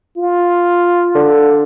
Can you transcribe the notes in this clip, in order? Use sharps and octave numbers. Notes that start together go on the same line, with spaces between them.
F4
D3